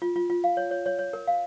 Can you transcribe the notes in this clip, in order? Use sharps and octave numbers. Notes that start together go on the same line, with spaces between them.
F4
F4
F4
F5
C#5
C#5
C#5
C#5
A#4
F5